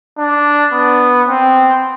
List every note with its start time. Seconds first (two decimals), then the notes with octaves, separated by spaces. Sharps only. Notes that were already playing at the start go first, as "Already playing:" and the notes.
0.18 D4
0.73 B3
1.28 C4